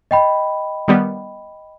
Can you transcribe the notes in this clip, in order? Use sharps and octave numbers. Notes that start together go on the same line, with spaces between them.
D#5 G5 B5
D#3 G3 B3